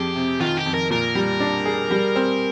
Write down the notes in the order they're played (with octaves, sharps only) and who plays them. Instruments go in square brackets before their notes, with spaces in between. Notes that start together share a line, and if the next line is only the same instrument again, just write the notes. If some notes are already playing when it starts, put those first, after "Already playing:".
Already playing: [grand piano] F2 G#4 [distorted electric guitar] G4
[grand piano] C3
[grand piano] D#3 [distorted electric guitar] F4
[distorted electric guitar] G4
[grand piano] F2
[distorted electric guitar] A#4
[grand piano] A#2 [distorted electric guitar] A#4
[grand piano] G3
D4
G#4
G3
C4